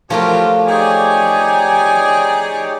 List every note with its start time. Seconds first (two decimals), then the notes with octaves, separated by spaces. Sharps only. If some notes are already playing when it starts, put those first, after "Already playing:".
0.10 F3 F#3 A3 F4 G4 A#4
0.68 D#4 G4 G#4 C#5 D5 G#5